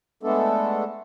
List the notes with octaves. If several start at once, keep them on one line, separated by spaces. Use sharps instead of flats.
G#3 A3 B3 D4 A4